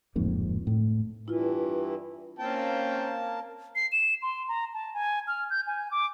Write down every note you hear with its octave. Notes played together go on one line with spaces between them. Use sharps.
D1 F2 G#2 A#3
A2
G2 E3 E4 F4
A#3 C4 C#4 G5 A5
C7
E7
C6
A#5
A5
G#5
F6
G6
G#5
D6